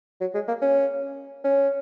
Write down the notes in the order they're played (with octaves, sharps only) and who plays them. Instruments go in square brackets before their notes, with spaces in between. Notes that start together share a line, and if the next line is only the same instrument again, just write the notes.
[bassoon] F#3
G#3
A#3
C#4
C#4